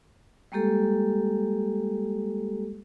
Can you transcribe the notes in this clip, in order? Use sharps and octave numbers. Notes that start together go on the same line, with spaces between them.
G3 G#3 A#3 G4 A4